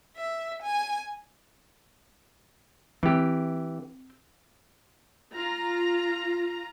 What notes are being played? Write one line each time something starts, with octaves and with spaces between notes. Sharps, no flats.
E5
G#5
E3 C4 G4
F4 A#5